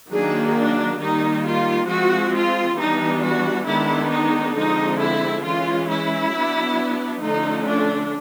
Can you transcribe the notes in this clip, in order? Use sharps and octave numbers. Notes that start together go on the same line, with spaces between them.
D#3 F#3 A#3 D4 G#4
D4
D#3 G3 A#3 D#4
F4
F3 G#3 C4 F#4
F4
E3 G3 B3 D4 D#4
F#4
D#3 G#3 B3 D4 E4
D#4
D3 F3 G#3 C4 D#4
E4
E3 G#3 C#4 F4
E4
F#3 B3 D4
D3 F3 A3 C#4 D#4
D4